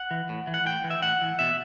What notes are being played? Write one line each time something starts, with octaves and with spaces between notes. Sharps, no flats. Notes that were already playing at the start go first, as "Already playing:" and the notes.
Already playing: F#5
E3
A2
E3
F#5
A2 G5
E3
E5
A2 F#5
E3
B2 E5